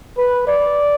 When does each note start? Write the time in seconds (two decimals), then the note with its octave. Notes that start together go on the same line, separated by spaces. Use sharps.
0.18 B4
0.47 D5